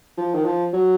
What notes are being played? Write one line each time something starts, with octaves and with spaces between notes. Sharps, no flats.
F3
D#3
F3
F#3